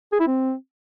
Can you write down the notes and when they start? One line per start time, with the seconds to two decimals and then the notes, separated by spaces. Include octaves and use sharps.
0.12 G#4
0.20 E4
0.27 C4